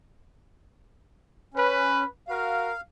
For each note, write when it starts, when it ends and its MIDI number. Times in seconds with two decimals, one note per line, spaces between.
1.54 2.04 61
1.54 2.05 71
2.28 2.69 66
2.28 2.69 70
2.28 2.81 77